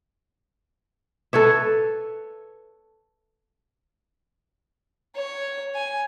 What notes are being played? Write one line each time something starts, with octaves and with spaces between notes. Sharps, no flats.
A4 B4 C#5 E5
C#5
G#5